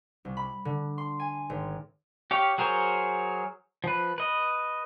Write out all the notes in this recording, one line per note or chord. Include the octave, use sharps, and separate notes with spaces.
C2
B5
D3
C6
G#5
G#1
G4 C#5 F5
F#3 G#4 A#4 C5 C#5
F3 B4
B4 D#5